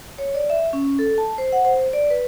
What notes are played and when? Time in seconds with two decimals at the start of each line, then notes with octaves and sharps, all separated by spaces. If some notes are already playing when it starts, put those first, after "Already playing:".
0.18 C#5
0.35 D5
0.50 E5
0.73 C#4
0.99 A4
1.18 A5
1.38 C5
1.52 F#5
1.65 C5
1.93 D5
2.10 B4